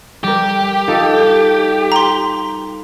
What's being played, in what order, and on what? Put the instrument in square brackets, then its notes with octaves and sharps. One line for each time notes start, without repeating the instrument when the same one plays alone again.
[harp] G3 A#4 [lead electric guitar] G4
[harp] D#4 F4 A4
[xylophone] A#5 C6